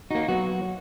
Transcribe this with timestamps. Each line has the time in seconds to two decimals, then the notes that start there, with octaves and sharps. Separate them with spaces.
0.11 A#3 D#4 F#4
0.28 F#3 B3 F#4